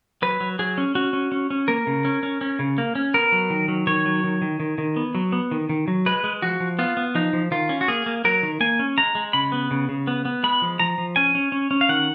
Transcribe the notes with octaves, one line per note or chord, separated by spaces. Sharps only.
F#3 B4
F#3
F#3 G#4
C#4
C#4 F#4
C#4
C#4
C#4
A#3 A#4
C#3
C#4
C#4
C#4
C#3
A#3
C#4
B3 A#4
F#3
D#3
F#3
D#3 C#5
F#3
D#3
D#3
D#3
D#3
B3
F#3
B3
D#3
D#3
F#3
G#3 B4
G#3
F3 F#4
F3
B3 F4
B3
F3 D#4
F3
D#3 F4
C#4
F#4
A#3 G#4
A#3
F#3 A#4
D#3
A#3 G#5
C#4
G#3 A#5
G#3
C#3 B5
B3
C#3
C#3
B3
B3
G#3 B5
F3
F3 A#5
F3
C#4 G#5
C#4
C#4
C#4
F5
D#3 F#5